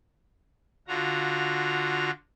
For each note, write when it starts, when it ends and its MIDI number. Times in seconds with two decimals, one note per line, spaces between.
0.88 2.11 50
0.88 2.11 65
0.88 2.11 66
0.88 2.11 82